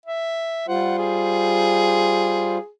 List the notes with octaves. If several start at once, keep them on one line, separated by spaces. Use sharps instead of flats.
E5
G3 F4 C5 F#5
G#4